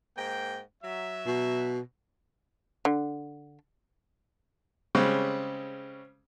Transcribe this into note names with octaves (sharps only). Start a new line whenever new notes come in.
G#2 A#3 G5
F#3 E5
B2
D3
C#3 G3 G#3 C4 C#4